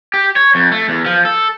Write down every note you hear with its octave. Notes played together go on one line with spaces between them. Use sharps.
G4
C#5
F2
A3
E2
F3
A4